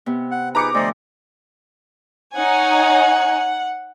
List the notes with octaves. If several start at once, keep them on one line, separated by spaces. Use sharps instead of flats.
C3 B3
F#5
D#4 G#4 B4 A#5 D6 C#7
D2 F3 C5 D5 D#5
D#4 C#5 F#5 G#5